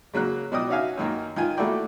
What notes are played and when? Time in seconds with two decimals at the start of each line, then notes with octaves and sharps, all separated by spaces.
0.13 C#3 F#3 A#3 F#6
0.52 B2 F#3 D5 D#5 G5 D#6
0.69 C#4 D#4 F#4 E5 F5 G#5
0.97 F#2 D#3 A#3
1.36 D#3 F4 G#5
1.57 A3 A#3 E4 F#4 D5 G5